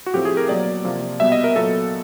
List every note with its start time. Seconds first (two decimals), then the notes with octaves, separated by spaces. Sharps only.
0.06 F#4
0.14 A2 F3 A3 C4 G4
0.25 G#4
0.37 A#4
0.49 B2 F#3 A#3 D5
0.85 C3 F3 A#3
1.20 B2 G3 B3 E5
1.32 D#5
1.44 A#4
1.56 A#2 F#3 B3 A4